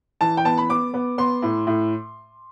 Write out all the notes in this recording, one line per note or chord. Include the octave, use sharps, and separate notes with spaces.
E3 A5
G5
B3 A5
B5
B3 D6
B3
B3 C6
A2
A2